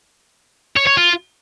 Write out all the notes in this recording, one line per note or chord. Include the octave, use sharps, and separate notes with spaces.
C#5
C#5
F4